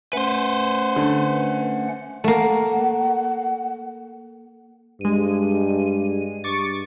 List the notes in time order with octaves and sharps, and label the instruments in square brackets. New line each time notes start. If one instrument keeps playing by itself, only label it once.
[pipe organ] A3 C#4 F#5 [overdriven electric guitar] B4 C5
[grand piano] D3
[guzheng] A3 A#3 [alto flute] F#5
[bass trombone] G2 [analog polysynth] G#3 D#7
[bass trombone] G2 [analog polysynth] C#6 D6 A6